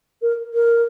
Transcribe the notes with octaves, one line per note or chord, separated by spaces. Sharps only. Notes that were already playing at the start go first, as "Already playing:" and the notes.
A#4
A#4